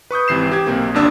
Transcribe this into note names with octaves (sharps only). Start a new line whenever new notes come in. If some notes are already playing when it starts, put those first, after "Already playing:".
B4 C#6 D#6 G6
G#1 C3 E3 C7 E7
G4 G#6
B1 C3 A#3 C4
G1 D#2 D4 E6